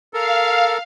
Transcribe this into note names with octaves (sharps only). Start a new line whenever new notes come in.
A4 A#4 F5